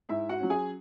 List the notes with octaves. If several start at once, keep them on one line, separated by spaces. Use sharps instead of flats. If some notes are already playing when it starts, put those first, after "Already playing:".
G#2 E4 E5
F#4 F#5
F#3 C#4
G#4 G#5